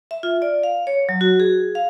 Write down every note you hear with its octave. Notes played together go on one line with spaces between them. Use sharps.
E5
F4
D5
F5
C#5
F#3
F#4
G#4
F5